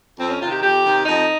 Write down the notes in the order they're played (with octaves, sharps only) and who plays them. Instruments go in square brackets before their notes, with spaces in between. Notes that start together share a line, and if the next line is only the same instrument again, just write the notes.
[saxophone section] F2 C4
C#4
C3 D#3 F4
G4
F2 G4
C3 D#3
F2 D#4